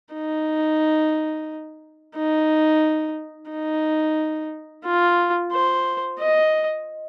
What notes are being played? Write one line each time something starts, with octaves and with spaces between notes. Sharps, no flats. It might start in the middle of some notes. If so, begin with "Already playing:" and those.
D#4
D#4
D#4
F4
C5
D#5